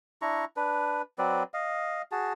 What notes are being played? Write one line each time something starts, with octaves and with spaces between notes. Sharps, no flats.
D4 E4 A#5 C#6
D4 B4
F#3 C4 B4 D5
D#5 F5
F#4 G#4 A5